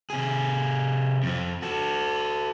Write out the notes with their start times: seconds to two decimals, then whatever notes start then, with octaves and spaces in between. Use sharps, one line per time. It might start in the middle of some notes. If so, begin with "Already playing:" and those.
0.10 C3 G#4
1.23 F2 F3
1.62 F#4 A4